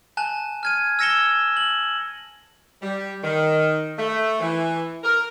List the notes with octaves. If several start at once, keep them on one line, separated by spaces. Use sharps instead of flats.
G#5 A5 F#6
F6 G#6 D#7
E6 G#6 A#6 C#7 E7 G7
F#7
G3
D#3
A3
E3
A#4